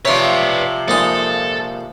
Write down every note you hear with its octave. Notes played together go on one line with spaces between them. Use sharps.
C3 F3 B4 C#5 D5 C6
A#1 G#3 D#4 A4